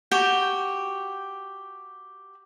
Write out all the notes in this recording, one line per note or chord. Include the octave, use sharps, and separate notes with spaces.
F#4 G4 G5 G#5